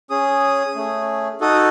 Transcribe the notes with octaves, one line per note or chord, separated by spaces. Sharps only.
C#4 G#4 D#6
A3 C#4 G#4
D#4 F#4 A4 D#6